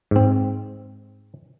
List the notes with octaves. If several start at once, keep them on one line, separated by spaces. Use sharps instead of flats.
G#2 C4